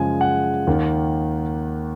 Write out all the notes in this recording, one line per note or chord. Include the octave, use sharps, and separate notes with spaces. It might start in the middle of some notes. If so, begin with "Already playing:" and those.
Already playing: F#2 C#3 F3 G#3 G#5
F#5
D#2 D#3 A#3